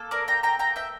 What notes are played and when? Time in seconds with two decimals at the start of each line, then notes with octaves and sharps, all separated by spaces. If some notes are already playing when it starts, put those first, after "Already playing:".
Already playing: A#3 A4
0.11 A#4 D5
0.28 G5 A#5
0.43 G5 A#5
0.59 G5 A#5
0.76 E5 G5